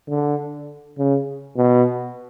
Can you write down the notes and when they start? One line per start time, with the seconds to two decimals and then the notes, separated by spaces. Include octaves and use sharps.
0.09 D3
0.99 C#3
1.57 B2